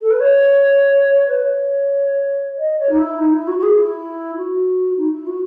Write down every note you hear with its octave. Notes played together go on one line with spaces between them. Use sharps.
A4
B4
C#5
B4
C#5
D#5
C#5
D#4
E4
D#4
E4
F#4
F#4
G#4
E4
F#4
D#4
E4
F#4